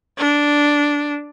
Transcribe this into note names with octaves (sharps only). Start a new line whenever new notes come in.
D4